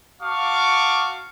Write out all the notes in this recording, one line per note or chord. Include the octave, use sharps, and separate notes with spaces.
F#4 F5 A5 C#6 D6